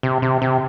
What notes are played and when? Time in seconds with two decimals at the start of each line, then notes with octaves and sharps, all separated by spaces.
0.03 C3
0.22 C3
0.42 C3